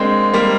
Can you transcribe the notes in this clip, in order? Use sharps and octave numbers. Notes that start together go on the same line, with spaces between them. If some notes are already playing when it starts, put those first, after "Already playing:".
Already playing: G#3 A#3 C4 D4
G3 A#3